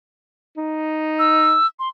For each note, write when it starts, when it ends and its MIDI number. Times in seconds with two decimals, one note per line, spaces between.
0.57 1.57 63
1.19 1.67 88
1.79 1.89 84